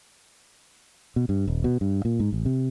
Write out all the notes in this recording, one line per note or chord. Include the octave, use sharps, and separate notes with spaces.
B2
G2
D#1
B2
G2
A#2
G#2
A1
C3